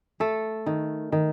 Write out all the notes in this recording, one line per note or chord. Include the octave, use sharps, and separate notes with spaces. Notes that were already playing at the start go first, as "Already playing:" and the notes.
A3 A4
D#3
D#3